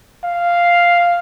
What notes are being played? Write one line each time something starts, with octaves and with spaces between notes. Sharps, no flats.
F5